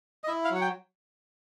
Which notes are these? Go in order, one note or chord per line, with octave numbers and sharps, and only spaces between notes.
D#5
E4 E5
F5
F#3 F#5
G5